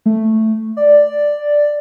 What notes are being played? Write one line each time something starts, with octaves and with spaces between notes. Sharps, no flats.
A3
D5